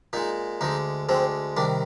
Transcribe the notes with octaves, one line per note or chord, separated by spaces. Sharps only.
A#2 G#3 D#4
D2 D3 G#3 D#4
D2 D3 G#3 C4
C2 C3 D#3 D4